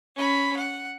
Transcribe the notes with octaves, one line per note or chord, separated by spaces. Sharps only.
C#4 B5
F#5